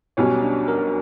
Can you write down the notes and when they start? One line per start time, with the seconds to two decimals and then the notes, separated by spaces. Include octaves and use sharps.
0.17 B1 B2 G3 C#4 C#5
0.43 D4
0.68 A#4